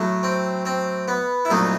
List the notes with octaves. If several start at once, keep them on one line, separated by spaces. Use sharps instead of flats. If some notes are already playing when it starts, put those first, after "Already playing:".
Already playing: A2 F#3 A3
C4
C4
B3
E4
C2 A#2 F#3 A3 D#4